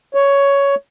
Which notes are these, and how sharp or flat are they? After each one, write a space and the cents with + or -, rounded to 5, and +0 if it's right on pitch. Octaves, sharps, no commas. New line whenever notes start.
C#5 +10